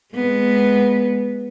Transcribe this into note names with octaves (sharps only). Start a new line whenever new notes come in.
G#3 B3